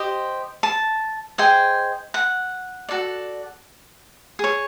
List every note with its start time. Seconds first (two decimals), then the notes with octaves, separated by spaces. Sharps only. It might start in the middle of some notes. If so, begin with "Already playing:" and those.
Already playing: G4 C5 D#5
0.63 A5
1.38 G#4 C5 D#5 G5
2.14 F#5
2.89 F#4 A4 D5
4.39 G#4 C#5